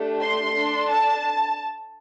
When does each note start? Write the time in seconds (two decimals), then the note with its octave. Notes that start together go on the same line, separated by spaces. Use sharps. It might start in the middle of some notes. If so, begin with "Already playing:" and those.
Already playing: A3 D4 G4
0.21 C6
0.54 D4 A4
0.88 A5